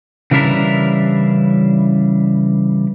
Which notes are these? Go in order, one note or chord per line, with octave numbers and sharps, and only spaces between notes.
C#3 E3 G3 D4 E4 A#4